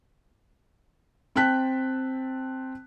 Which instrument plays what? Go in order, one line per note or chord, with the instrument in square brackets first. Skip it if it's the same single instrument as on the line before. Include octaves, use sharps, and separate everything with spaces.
[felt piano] C4 G5 A5 F#6 B6